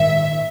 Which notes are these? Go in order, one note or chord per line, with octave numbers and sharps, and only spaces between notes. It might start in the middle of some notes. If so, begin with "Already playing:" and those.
Already playing: A#1 G#2 D#3 E5